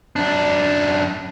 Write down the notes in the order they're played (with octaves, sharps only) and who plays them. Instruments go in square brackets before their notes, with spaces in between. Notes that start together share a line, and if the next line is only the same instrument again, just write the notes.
[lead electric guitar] F#2 D4